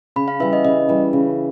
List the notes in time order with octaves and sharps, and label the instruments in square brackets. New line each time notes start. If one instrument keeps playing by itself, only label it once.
[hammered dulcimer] C#3 [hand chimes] B5
[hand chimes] F5
[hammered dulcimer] E3 G3 [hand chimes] E5
[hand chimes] D#5
[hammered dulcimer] C#3 [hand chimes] D#5
[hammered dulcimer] E3 G3
C#3